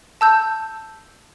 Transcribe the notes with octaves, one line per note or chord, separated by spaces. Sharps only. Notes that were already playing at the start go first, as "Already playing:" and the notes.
A5 E6 G6